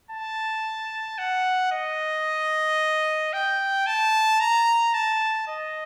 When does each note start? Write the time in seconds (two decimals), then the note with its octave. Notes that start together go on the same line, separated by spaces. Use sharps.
0.11 A5
1.18 F#5
1.72 D#5
3.33 G5
3.87 A5
4.40 A#5
4.94 A5
5.47 D#5